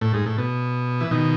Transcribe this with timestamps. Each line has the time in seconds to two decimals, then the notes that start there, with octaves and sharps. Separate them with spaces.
0.01 A2
0.14 G#2
0.26 A2
0.38 B2
1.01 E3
1.11 B2 D#3